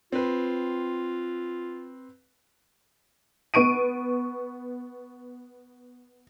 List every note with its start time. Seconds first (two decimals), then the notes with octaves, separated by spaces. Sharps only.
0.12 C4 F4 B4
3.54 B3 C#6 D7 D#7